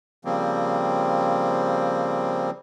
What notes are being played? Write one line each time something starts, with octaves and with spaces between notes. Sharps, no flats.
C#3 F3 G3 A#3 C4